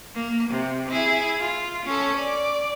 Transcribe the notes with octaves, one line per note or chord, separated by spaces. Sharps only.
A#3
C3
E4 G#4
F4
C#4 A4
D5